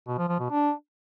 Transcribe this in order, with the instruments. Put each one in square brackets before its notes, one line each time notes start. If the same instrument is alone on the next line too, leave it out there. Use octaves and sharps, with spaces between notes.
[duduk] B2
F3
F3
B2
D4